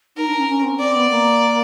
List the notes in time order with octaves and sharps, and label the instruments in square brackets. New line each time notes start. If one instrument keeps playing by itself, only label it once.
[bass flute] D#4 [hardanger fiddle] A#4
[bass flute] D4
C#4
C#4
C4
[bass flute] C4 [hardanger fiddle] D5
[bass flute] B3
A#3